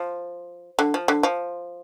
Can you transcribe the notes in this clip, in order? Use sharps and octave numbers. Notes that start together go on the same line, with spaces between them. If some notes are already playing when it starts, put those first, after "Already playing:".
Already playing: F3
D3
F3
D3
F3